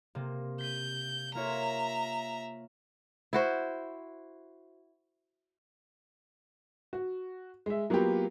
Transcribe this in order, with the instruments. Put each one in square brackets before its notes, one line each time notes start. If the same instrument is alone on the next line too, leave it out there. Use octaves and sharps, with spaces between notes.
[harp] C3 A#3
[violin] G6 [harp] B6 D#7
[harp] A#3 F4 C#5 [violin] E5 A#5
[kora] E4 F#4 C5
[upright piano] F#4
G#3 E5
F#3 A#3 B3 F4 G4